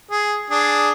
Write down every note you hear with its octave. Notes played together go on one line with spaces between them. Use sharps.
G#4
D4 G#4